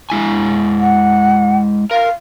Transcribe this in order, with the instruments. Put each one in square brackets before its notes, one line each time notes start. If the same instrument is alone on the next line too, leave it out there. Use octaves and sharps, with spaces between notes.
[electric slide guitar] G#3 E4 G#5
[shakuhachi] F#5
[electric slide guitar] A#4 [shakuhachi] F5